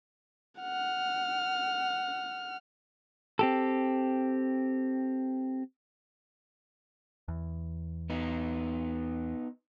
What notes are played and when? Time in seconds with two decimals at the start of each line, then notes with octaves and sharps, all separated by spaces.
0.60 F#5 F6
3.39 C4 G4 A4
7.28 E2
8.10 B3 D#4